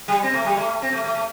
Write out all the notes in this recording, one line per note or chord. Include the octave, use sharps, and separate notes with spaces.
G3
C4
A3
G3
A3
C4
A3
A3
A3